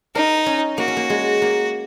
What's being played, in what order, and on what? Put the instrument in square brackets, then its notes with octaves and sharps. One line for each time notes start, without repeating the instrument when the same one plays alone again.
[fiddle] D#4 [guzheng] A#4
[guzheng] C#4
[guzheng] A#3 [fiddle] F#4
[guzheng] C#4
A#3
G#3
A#3